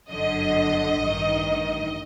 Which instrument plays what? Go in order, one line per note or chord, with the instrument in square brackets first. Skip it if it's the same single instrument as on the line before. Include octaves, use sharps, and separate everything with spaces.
[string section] G1 F#2 D3 D#5
A1 G2 D#3